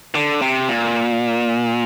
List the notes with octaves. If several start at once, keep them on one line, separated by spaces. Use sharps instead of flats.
D3
C3
A#2